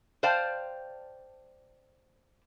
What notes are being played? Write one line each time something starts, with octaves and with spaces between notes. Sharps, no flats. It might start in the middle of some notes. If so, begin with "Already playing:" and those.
C5 D5 F5 G5 A5